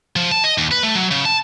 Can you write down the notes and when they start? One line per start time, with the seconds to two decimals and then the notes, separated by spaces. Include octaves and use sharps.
0.16 F3
0.32 A5
0.44 D#5
0.58 D#2
0.71 B4
0.83 A3
0.95 F#3
1.11 C#3
1.26 A5